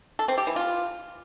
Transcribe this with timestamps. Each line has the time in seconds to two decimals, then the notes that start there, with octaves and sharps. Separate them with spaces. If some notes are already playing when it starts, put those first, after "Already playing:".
0.19 A4
0.28 C4
0.38 G4
0.47 E3
0.56 F4